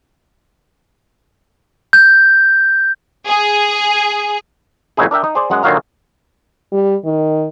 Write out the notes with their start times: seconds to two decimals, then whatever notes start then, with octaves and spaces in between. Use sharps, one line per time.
1.93 G6
3.27 G#4
4.97 G1 F2 F#3 D#4 E4 G#4
5.11 D4 A#4 E5 G5
5.24 D#4
5.35 G#4 C5 D5
5.50 F#2 G#3 F#5
5.63 A#2 D3 D#3 F#3 F5 A#5
6.72 G3
7.05 D#3